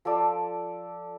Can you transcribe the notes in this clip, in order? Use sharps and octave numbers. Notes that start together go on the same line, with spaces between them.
F3 A4 D5